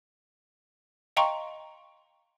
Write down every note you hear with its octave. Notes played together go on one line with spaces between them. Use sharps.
D#5 F5 G5 A#5 C6 C#6